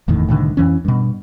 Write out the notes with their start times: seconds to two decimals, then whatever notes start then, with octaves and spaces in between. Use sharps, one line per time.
0.08 F#1 E2 A2 D#3
0.28 C2 A2 D3 D#3
0.57 F2 E3 C#4
0.85 G2 B2